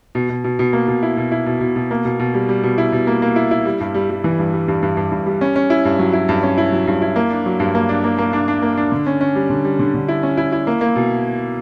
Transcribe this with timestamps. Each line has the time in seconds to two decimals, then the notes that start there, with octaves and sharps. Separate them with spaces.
0.15 B2
0.29 B2
0.44 B2
0.59 B2
0.73 A#3
0.88 B2
1.03 E4
1.17 B2
1.32 E4
1.46 B2
1.61 B2
1.76 B2
1.91 A#3
2.05 B2
2.20 B2
2.34 G3
2.49 G3
2.63 B2
2.78 E4
2.92 B2
3.07 A#3
3.22 A#3
3.36 E4
3.51 E4
3.65 G3
3.80 G2
3.94 G3
4.10 G3
4.24 E3
4.39 G2
4.53 G3
4.68 G2
4.82 G2
4.97 G2
5.12 G2
5.26 G3
5.41 C#4
5.56 C#4
5.70 E4
5.85 G2
5.99 F#3
6.13 E4
6.29 G2
6.43 C#4
6.58 E4
6.72 F#3
6.87 G2
7.02 E4
7.16 A#3
7.31 D4
7.46 F#3
7.60 G2
7.75 A#3
7.89 D4
8.04 A#3
8.18 A#3
8.33 D4
8.48 D4
8.62 A#3
8.77 D4
8.92 D3
9.07 C#4
9.21 C#4
9.36 G3
9.50 D3
9.65 G3
9.79 D3
9.94 D3
10.08 E4
10.23 C#4
10.37 E4
10.52 E4
10.67 A#3
10.81 A#3
10.96 B2